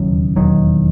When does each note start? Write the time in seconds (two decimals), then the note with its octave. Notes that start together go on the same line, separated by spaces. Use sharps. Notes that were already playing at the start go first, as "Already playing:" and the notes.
Already playing: E1 D#2 C#3 F#3
0.36 E1 D#2 D#3 F#3